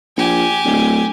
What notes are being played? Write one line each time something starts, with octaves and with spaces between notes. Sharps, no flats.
A#1 G4 G#5
D1